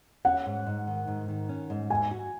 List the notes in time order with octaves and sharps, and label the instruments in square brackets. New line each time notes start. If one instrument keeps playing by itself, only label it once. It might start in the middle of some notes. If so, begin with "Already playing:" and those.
[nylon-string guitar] C#4 [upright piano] F#5
[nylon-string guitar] G#2
G#2
D#3
G#2
D#3
C#4
G#2
[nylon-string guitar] G#2 [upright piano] G#5
[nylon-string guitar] F#4